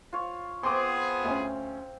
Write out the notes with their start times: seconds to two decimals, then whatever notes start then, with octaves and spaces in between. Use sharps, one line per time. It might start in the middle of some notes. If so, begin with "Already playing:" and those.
0.13 F4 C#5
0.63 B3 C4 F4 G#4 C6 D6
1.24 D2 C#4